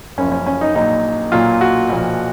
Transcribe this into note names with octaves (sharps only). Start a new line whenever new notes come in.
F#1 F#2 F3 C#4
C#4
C#4
D#4
A#1 A#2 F#3 D#4
B1 A#2 F#3 F4
F#4
B1 A#2 F3